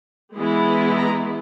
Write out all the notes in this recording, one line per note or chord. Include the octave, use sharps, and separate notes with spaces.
E3 G#3 B3 E4
A#5